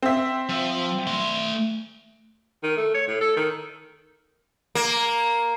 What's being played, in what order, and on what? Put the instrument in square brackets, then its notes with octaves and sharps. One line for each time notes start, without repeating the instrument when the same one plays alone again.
[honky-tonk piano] C4 E5
[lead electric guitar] F3
A3 C6
[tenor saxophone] D#3
A3
C#5
A2
A4
D#3
[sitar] A#3